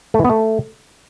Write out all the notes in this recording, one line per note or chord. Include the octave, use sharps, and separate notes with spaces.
A3
E3
B3
A3